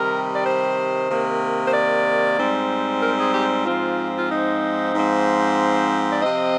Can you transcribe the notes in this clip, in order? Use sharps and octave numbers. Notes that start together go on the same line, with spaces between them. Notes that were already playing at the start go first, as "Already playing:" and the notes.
Already playing: C3 D#3 G3 A#4
D5
C5
C3 D#3 A#3
C5
D5
G#2 G3 C4
A#4
G#4
G4
G#2 F3 C4 F4
F4
D#4
G#2 F3 C4
D5
C3 F3 C4 D#5